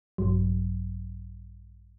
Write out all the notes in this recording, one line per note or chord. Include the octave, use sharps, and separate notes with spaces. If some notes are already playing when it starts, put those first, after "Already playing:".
A#1 G2 F#3